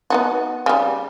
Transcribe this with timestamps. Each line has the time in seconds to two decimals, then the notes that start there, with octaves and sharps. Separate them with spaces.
0.10 B3 D#4 F#4
0.66 C#3 G3